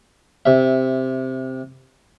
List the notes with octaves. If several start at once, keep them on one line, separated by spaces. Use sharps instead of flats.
C3 E5